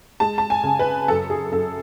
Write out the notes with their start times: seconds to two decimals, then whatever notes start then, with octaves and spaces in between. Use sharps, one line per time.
0.20 G#3 A5
0.38 A5
0.50 G#5
0.64 C#3
0.79 B4
1.08 F#2 A4
1.30 G#4
1.51 F#2 A4